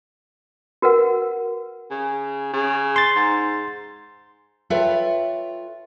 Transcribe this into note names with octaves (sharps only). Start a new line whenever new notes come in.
F#4 A#4 B4 F#5
C#3
C#3
C6 A6
G#2
F4 A4 B4 C#5 E5 G5